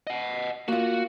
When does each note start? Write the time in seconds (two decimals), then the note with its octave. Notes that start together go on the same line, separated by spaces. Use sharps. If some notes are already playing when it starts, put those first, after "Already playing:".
0.07 D#5 F#5
0.68 A#3 F4 F#4